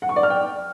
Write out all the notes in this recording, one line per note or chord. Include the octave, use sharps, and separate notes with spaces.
F#5
C#6
D5
F6
G5